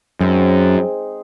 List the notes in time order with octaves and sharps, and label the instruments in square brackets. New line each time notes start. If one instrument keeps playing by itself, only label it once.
[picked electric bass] F#2 [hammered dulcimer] G#3 C4 D#4 G#4